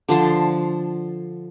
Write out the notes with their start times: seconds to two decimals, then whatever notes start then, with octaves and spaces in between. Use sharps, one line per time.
0.09 D3 F3 A5 C6